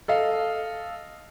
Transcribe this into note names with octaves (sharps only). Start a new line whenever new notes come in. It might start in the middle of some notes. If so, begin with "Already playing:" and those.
A4 D#5 F5